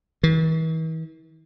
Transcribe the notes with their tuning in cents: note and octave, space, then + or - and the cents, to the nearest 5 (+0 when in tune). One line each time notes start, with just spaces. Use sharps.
E3 -45